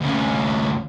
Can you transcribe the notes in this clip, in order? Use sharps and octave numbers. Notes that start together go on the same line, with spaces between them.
D2 C#4